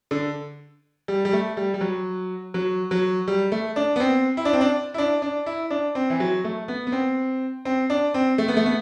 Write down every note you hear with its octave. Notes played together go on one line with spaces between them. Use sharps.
D3
G3
G3
A3
G3
G3
F#3
F#3
F#3
G3
A3
D4
B3
C4
E4
D4
C4
D4
E4
D4
D4
E4
D4
C4
E3
F#3
A3
B3
B3
C4
C4
D4
C4
A3
B3
A3
B3